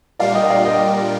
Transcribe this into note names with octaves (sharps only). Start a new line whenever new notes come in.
A#2 G3 D4 F4 A#4 D5 F5
D#5 G5
D5 F5
D#5 G5